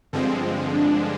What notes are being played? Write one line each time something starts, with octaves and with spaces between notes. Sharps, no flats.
G2 D3 F3 G#3 C4
D4